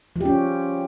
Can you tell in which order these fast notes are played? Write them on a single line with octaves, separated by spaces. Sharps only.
F3 G4 C#4